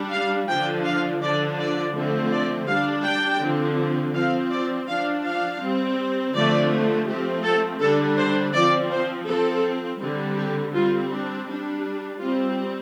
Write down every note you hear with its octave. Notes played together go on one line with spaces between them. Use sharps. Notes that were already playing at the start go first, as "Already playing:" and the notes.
Already playing: G3 D4
F5
D3 F3 D4 G5
F5
D3 F3 D4 D5
D5
D3 F3 A3 C4
D5
G3 D4 F5
G5
D3 F3 C4
F3 C4 F5
D5
F3 D4 F5
F5
G3 C4
D3 F3 A3 C4 D5
F3 A3 C4 G4
A4
D3 G3 D4 A4
C5
F3 C4 D5
C5
F3 C4 A4
D3 G3 C4
G4
G3 C4 F4
D4
G3 D4
G3 C4 F4